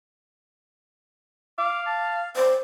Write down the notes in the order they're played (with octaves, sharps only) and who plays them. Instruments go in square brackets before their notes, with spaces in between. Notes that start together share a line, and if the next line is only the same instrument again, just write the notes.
[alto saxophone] F5 [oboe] D6
[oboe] A5
[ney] C5 [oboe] D5